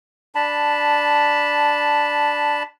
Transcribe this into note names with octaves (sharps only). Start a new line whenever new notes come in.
D4 A5 B5